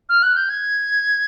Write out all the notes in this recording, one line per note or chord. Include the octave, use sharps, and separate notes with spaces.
F6
F#6
G6
G#6